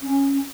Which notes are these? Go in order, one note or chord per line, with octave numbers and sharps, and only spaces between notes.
C#4